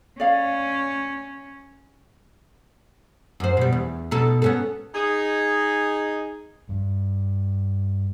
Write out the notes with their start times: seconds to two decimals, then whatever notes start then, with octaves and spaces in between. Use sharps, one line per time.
0.20 C#4 D5 F5
3.40 F#2 C5
3.57 B2 G3
3.72 E2
4.11 B2 D#4 A4
4.42 B3 C#4 A4
4.95 D#4 G#4
6.69 G2